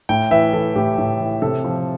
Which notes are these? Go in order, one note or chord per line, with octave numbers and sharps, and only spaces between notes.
A2 G5
E3 E5
E3 A4
A2 G4
A2
E3
C3 A4
F3